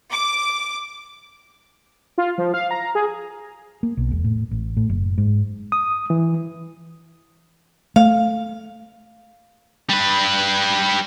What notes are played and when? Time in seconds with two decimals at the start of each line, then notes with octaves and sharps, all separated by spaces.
0.12 D6
2.18 F4
2.38 F3
2.54 F5
2.71 A#5
2.95 G#4
3.83 A#3
3.97 B1
4.11 E1
4.25 A2
4.51 A1
4.77 A2
4.89 F#1
5.18 G#2
5.72 D#6
6.10 E3
7.96 A3 F5
9.89 G3 B4